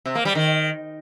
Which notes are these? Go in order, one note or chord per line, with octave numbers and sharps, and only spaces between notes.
C3
A#3
G3
D#3